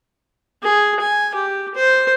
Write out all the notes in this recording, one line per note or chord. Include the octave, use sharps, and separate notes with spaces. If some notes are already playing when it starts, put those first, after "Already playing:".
G#4
G#5
G4
C5